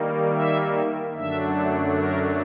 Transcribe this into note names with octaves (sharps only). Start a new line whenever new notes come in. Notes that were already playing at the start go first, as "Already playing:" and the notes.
Already playing: D#3 G3 A#3
E5
F#2 D3 F#3 A3 D4 E5
A#4